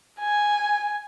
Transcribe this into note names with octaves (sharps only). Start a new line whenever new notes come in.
G#5